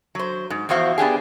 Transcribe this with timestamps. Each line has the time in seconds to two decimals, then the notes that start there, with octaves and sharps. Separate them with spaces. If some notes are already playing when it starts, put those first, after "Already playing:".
0.15 F#3 C5
0.50 G#2
0.69 E2 F3 E4 F#4 C5 F5
0.98 B3 D4 G4 G#4